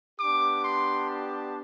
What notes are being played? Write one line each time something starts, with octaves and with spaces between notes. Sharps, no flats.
B3 D4 G4 D6
C6
A5